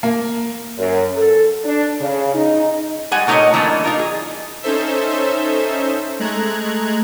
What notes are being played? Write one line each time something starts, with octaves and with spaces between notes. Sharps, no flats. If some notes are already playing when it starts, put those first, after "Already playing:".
A#3
F#2
A4
D4
C#3
D#4
G3 G#3 F#5 G#5
A#2 A3 D#4 A#4 C#5 D#5
E3 F#3 A3 A#3 D4
D#4 F4 A#4
G#4
C#4 D#4 A4 C5 E5
G#3 A3 A#5 F#6 G#6